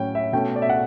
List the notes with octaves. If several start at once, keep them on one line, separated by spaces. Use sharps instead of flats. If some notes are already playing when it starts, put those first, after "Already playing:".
Already playing: A2 F#3 C#4 G5
E5
B2 A3 C#4 G5
D5
E5
F#5